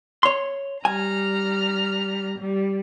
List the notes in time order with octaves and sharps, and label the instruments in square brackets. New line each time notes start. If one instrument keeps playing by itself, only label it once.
[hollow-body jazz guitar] C#5 C6
[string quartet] G3 A#5 F6 [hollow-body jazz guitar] G#5
[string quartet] G3